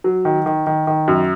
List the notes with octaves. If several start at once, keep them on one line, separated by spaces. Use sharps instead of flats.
F#3
D#3
D#3
D#3
D#3
F#2